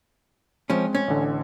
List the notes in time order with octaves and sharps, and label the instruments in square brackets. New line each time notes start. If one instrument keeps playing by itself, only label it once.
[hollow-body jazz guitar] F3 C#4 [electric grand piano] G#3 C4
[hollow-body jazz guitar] C#4
[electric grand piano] A1 D3